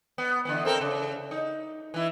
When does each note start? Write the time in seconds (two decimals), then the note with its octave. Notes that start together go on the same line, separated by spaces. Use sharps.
0.18 B3
0.45 D3 E3 B3
0.65 C4 A4 A#4
0.81 C#3
1.31 D#4
1.94 E3 E4